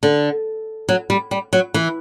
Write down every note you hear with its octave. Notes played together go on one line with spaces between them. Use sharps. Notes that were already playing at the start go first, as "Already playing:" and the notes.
D3
F#3
G3
G3
F#3
E3